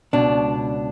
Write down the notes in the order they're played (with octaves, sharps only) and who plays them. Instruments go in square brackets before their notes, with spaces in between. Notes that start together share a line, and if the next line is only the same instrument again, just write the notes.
[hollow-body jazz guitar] C#2 B2 D4